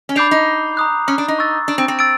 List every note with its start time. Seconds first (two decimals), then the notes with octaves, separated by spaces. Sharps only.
0.09 C#4
0.16 D4 B5 D6 G6 C7 F7
0.31 D#4
0.77 A#5 D#6 F#6
1.08 C#4
1.18 D4
1.28 D#4
1.38 C#6 E6 A6
1.68 D4
1.78 C4
1.88 C4
1.99 E6 A6 D7